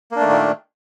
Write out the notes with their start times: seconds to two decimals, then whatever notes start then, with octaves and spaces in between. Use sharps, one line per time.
0.12 A#3
0.16 D4
0.20 A3
0.25 D#3
0.29 A#2